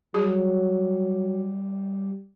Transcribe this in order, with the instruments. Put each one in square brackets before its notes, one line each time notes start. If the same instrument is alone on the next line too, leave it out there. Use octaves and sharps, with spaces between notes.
[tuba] F#3 [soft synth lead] G3 [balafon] G#4